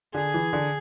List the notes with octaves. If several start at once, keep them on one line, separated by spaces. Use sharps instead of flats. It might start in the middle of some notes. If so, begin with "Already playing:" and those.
D3 G#4
E3
D3